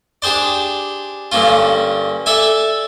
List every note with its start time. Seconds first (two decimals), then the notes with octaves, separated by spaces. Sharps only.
0.22 D4 G4 G#4 C5 D5
1.32 G2 D3 A#3 C#4 F4
2.26 A4 D5 E5 G#5